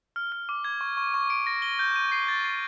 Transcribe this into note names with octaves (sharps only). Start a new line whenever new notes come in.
F6
F6
D6
G#6
C#6
C#6
C#6
D7
A#6
G7
G6
D#7
C7
A6
C7